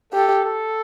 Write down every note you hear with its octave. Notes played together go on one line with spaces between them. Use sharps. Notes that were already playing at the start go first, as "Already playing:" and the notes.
G4 A4
A4